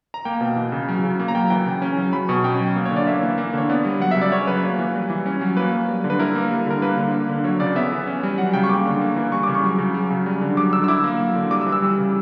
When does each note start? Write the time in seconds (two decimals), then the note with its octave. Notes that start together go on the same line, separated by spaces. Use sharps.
0.14 A#5
0.25 A#3 G5
0.41 B2
0.56 E3
0.72 C#3
0.88 F#3
1.04 C#3
1.20 A#3
1.28 A#5
1.35 F#3 G5
1.50 E3 G5
1.66 C#3
1.82 C#4
1.97 F#3
2.13 F#3 B5
2.29 B2 C#6
2.44 C#4 G5
2.60 F#3
2.75 A#3
2.85 C#5
2.91 D3
2.96 D5
3.07 A#3 E5
3.23 E3
3.38 A#3
3.53 D3 C#5
3.69 B3 D5
3.85 G3
4.00 F#3 F#5
4.11 E5
4.16 C#3
4.21 D5
4.32 C#4 C#5
4.47 F#3 B4
4.63 A#3
4.78 E3
4.94 G3
5.10 E3
5.26 C#4
5.41 F#3
5.57 A#3 B4
5.73 F#3
5.88 G3
6.04 D3
6.10 B4
6.19 E4 A#4
6.35 A#3
6.50 G3
6.66 D3 A#4
6.82 A#3 B4
6.97 D3
7.13 A#3
7.29 D3
7.44 F#3 C#5
7.60 C#3 D5
7.76 B3 E5
7.92 E3
8.07 C#4
8.23 G3
8.38 F#3 F#5
8.53 C#3 G5
8.64 C#6
8.69 A#3 D6
8.85 D3
9.01 A#3
9.16 E3
9.32 G3 C#6
9.43 C#3 D6
9.55 C#6
9.64 F#3
9.78 C#3
9.94 F#3
10.10 C#3
10.26 G3
10.41 D3
10.57 F#3 D6
10.72 D3 E6
10.84 E6
10.88 E4 D6
11.04 A#3
11.20 F#3
11.35 D3
11.51 G3 D6
11.61 E6
11.66 E3
11.72 E6
11.82 G3
11.97 C#3